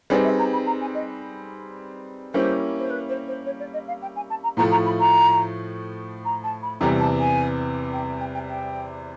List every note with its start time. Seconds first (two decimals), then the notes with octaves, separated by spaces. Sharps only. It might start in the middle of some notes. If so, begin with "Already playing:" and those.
0.10 G3 C4 D#4 G#4 B4 D5
0.24 E5
0.38 A#5
0.52 B5
0.66 A#5
0.80 G#5
0.94 D#5
2.34 G3 A#3 C#4 E4 C5
2.78 C5
2.90 B4
3.09 C5
3.27 C5
3.45 C#5
3.59 D5
3.73 D#5
3.87 F5
4.01 G5
4.16 G#5
4.30 A5
4.43 A#5
4.57 A2 F3 A3 A#5
4.71 A#5
4.85 B5
4.99 A#5
6.25 A#5
6.43 A5
6.62 B5
6.80 E2 C3 E3 G3 A#5
6.99 A5
7.18 G#5
7.92 G5
8.20 G5
8.34 G5
8.48 G5